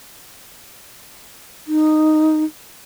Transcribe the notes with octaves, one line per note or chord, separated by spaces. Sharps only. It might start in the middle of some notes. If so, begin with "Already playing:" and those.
D#4